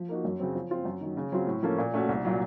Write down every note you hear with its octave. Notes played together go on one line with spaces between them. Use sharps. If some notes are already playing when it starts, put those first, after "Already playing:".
Already playing: F3
A#3 D#4 F#4
F#2
C#3 F#3 C4
F3
C4 F4
F#2
D#3 F#3
C#3
F#3 C4 F4
A2
F3 A#3 C#4 A4
A#2
A3 C#4 F#4
C2
A#2 F#3